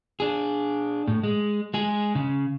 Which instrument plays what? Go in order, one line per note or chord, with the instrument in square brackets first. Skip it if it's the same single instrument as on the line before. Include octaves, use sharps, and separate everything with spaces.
[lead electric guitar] D4 G#4
A2
G#3
G#3 G#4
C#3